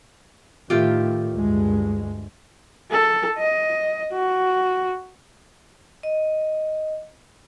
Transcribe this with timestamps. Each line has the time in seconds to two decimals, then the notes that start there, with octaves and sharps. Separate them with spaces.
0.70 A2 D#3 A3 F4 G4
1.33 D2 G2 G#3
2.91 A4
3.38 D#5
4.13 F#4
6.03 D#5